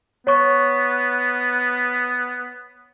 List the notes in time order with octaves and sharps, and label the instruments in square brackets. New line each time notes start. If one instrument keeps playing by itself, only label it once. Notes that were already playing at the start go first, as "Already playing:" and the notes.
[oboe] B3 [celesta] C#5 C#6